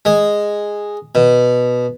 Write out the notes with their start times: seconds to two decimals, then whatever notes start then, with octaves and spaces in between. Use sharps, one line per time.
0.05 G#3
1.15 B2